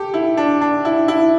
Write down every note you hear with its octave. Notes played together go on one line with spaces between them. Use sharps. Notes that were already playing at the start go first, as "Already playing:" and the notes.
Already playing: G4 A4
E4
D4
D4
E4
E4